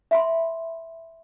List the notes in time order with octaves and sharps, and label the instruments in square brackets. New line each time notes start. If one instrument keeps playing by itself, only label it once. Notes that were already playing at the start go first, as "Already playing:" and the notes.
[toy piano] E5 B5 C6